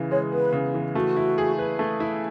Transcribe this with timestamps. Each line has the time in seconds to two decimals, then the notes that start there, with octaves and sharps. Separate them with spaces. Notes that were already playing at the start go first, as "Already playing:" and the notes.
Already playing: C#3 E3
0.11 G#3 C#5
0.32 B3 B4
0.53 C#3
0.74 E3
0.95 A3 F#4
1.16 E4
1.38 G#4
1.59 B4
1.79 A3
2.00 E4